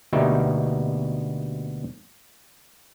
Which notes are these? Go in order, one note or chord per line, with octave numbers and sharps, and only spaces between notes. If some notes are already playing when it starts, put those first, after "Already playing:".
D2 B2 A#3 D#4 G4 E5